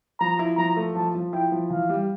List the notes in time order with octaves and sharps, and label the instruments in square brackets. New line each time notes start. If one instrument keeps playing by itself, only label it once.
[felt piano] F3 [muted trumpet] A#5
[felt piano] E4
[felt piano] F3 [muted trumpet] A#5
[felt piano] A3
[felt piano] F3 [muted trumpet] A5
[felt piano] F3
[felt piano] E4 [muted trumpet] G5
[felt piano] F3
[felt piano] E3 [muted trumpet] F5
[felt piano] G3